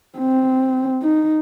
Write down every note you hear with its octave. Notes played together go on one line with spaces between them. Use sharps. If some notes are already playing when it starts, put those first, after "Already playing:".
C4
D#4